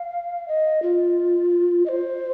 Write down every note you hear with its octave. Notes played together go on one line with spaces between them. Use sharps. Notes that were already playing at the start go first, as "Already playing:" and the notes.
Already playing: F5
D#5
F4
D#5
C5